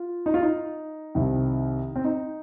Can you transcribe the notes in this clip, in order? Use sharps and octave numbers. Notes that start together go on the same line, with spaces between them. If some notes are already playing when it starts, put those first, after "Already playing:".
Already playing: F4
D#4
F4
D#4
C2 C3 D#3
C4
D#4